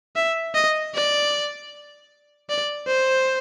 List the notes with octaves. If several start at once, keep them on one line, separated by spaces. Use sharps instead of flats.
E5
D#5
D5
D5
C5